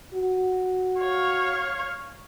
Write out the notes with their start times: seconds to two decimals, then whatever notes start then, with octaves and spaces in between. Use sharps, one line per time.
0.14 F#4
0.98 C#5 F5